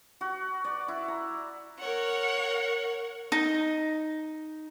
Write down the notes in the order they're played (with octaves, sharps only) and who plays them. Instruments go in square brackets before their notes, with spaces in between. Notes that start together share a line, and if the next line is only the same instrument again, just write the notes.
[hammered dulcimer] F#4
D5
E4
A#5
[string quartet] A#4 C#5 F#5
[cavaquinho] D#4